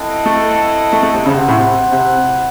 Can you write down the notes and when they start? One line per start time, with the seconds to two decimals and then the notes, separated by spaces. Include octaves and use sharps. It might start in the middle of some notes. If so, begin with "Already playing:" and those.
Already playing: C4 E4 A4 D#5 F#5
0.26 A3
0.93 A3
1.03 A3
1.14 C3
1.26 C#3 E4 C5 F#5
1.37 C3
1.48 A2
1.59 C3
1.92 C3